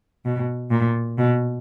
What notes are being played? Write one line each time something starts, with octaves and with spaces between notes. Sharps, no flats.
B2
A#2
B2